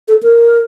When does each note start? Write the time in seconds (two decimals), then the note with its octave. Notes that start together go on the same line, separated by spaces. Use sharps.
0.08 A4
0.23 A#4